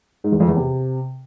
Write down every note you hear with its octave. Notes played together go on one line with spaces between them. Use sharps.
G#2
E2
F2
E2
C3